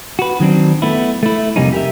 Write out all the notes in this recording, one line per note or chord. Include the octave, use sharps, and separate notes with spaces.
F#4 B4
D#3 F#3 C4 D4
A3 B3 E4
A3 E4
F2 C3 G3 A#3 C#4 D#4
G4 A#4 E5